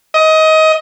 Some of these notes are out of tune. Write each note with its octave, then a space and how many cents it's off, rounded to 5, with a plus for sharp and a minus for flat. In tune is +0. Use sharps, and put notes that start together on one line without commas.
D#5 +25